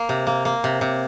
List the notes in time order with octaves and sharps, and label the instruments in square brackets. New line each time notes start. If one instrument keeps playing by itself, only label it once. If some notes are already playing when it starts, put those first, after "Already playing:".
Already playing: [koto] A#3
C3
A#3
A#3
C3
C3